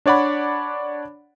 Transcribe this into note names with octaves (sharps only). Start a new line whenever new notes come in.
D4 C#5 D5 F#5 B5